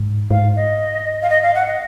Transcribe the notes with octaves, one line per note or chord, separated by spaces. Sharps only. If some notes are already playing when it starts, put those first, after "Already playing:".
Already playing: G#2
G#2 F5
D#5
F5
D#5
F5
F#5
D#5